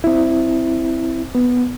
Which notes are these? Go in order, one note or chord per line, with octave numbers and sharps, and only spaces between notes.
C4 E4
B3